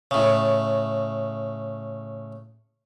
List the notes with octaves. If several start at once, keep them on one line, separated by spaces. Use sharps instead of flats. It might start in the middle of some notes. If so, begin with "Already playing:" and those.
A2 C#3